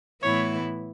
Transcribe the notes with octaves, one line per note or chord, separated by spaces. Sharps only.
A2 E3 B3 E4 C#5